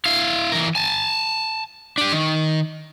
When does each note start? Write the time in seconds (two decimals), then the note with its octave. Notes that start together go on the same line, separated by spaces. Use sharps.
0.05 E4 F5
0.52 E3 A#4
0.75 G#5 A5
1.98 D4 G4
2.12 D#3